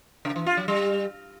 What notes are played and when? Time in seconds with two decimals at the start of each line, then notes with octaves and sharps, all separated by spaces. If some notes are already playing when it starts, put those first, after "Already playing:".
0.25 C#3
0.36 E3
0.46 F4
0.57 F#3
0.68 G3